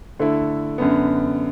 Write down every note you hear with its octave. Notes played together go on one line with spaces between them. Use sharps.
D3 A3 E4
F#2 D3 B3